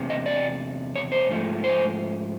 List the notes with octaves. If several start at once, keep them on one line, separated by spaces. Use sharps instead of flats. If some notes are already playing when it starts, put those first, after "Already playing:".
Already playing: E2 C3
D#5
D5
C#5
C5
G#2 F3 A3
C5